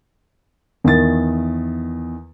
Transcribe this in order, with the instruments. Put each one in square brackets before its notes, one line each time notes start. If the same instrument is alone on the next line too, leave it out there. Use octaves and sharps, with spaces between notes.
[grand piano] E2 D#3 A6